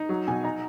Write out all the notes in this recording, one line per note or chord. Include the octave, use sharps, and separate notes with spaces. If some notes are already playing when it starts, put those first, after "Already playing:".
Already playing: D#4
F#3
B2 G#5
D#4 A#5